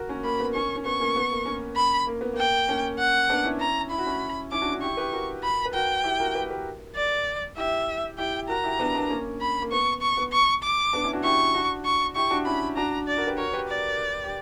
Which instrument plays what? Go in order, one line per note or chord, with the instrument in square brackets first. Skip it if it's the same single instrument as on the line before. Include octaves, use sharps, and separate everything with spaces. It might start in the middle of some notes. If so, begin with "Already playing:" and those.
Already playing: [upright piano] F#4 A#4
A#3 C#4
[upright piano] A#3 [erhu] B5
[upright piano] B3
[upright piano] A#3 C#4 [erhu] C#6
[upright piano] C#4
[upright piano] B3 [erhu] C#6
[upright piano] A#3 C#4
B3
A#3
A#3 C#4
[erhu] B5
[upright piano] A#3
B3
[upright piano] A#3 [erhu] G5
[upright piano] A#3 C#4
[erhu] F#5
[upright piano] B3 D4
C#4 E4
[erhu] A#5
[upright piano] E4 [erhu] B5
[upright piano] F#4
C#4 E4
[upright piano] C#4 E4 [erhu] D6
[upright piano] D4 F#4
D4 F#4
[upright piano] E4 G4 [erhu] C#6
[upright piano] G4 B4
F#4 A#4
[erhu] B5
[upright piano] B4
[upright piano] F#4 A#4 [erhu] G5
[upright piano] E4 G4
F#4 A#4
G4 B4
G4 B4
[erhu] D5
[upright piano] E4 G4 [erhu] E5
[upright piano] E4 G4 [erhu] G5
[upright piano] F#4 A#4 [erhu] A#5
[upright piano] E4 G4
B3 D4
B3 D4
A#3 C#4
[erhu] B5
[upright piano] A#3
[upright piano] B3 [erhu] C#6
[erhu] C#6
[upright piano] B3
[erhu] C#6
D6
[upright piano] B3 D4
C#4 E4
D4 F#4
[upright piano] E4 G4 [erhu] C#6
[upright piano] D4 F#4
[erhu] C#6
[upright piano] E4 G4 [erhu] C#6
[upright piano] D4 F#4
[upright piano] C#4 E4 [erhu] B5
[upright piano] D4 F#4 [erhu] A#5
[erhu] D5
[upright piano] F#4 A#4
G4 B4
[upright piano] F#4 A#4 [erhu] C#5
[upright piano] G4 B4
[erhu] D5
[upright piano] G4